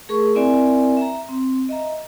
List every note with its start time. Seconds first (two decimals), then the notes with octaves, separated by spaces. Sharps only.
0.09 A3 G#4 A#4 C#6
0.35 C4 E4 A#4 D5 E5 G#5
0.97 E5 A#5
1.29 C4
1.69 D#5 E5 A#5